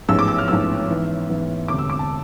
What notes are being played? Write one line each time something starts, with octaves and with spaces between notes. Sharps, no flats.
A1 G#2 F3 G#3 B3 E6
D6
E6
F6
A1 G#2 F3 G#3 B3 E6
G#2 E3 B3
G#2 E3 B3
E1 D2 C3 D6
E6
D6
A5